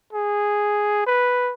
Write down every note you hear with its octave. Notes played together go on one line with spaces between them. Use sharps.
G#4
B4